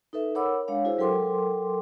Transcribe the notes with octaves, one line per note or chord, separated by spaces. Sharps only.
D#4 A4 B4 E5
A#4 C#5 F#5 B5 D6 E6
G#3 D4 C#5 F5
E4 F#4 G#4 C5
F#3 A4 A#4 G5 C6 D6